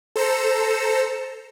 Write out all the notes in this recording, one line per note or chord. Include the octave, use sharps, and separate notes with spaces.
A4 C5 A#5 E6 C#7